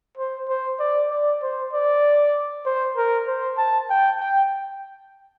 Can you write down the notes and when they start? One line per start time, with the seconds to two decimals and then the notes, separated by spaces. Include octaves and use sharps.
0.18 C5
0.49 C5
0.80 D5
1.11 D5
1.42 C5
1.73 D5
2.66 C5
2.97 A#4
3.27 C5
3.58 A5
3.90 G5
4.20 G5